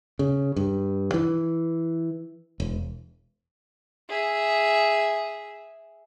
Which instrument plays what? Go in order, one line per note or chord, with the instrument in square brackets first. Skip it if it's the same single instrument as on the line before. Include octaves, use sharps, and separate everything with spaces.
[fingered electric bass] C#3
G2
E3
E1
[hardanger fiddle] G#4 E5